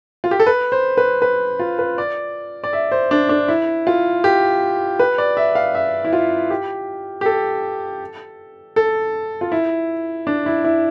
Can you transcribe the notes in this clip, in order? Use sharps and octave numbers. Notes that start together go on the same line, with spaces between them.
F4
G4
A4
B4
C5
B4
B4
F4
B4
D5
D5
E5
C5
D4
D4
E4
F4
G4
B4
D5
E5
F5
E5
E4
F4
G4
G4
A4
A4
F4
E4
D4
E4
E4